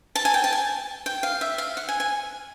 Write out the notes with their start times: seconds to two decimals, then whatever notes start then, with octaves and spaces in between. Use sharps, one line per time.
0.15 A5
0.25 G#5
0.34 G5
0.44 A5
0.53 G#5
1.06 G5
1.23 F5
1.41 E5
1.58 F5
1.77 F#5
1.89 G#5
2.00 G#5